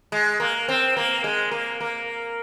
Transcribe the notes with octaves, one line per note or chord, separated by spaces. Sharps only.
G#3
A#3
C4
A#3
G#3
A#3
A#3